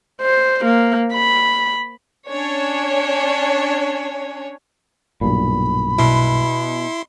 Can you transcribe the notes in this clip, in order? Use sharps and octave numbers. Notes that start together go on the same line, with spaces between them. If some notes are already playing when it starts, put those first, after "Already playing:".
C5
A#3
B5
C#4 D4 C#5
B1 G2 A#2 B5
B2 E4 C6